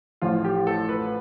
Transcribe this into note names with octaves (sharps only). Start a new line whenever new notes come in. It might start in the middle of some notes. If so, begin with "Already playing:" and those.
A1 A2 F3 A3 F4
G4
A4
B4